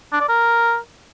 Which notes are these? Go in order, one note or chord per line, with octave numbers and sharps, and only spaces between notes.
D4
D5
A#4